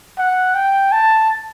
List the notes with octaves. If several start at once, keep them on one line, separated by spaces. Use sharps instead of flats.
F#5
G5
A5